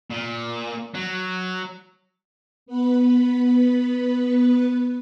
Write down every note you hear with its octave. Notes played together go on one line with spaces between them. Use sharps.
A#2
F#3
B3 B4